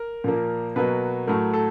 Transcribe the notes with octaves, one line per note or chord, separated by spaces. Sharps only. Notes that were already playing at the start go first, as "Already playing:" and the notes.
Already playing: A#4
A#2 F3 A#3
B2 F#3 A#3 B4
A2 F#3 A3 A#4
A4